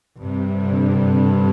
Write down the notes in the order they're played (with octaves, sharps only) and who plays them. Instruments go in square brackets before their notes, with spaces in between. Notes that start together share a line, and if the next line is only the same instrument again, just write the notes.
[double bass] G2 [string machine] C3
[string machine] D3
C3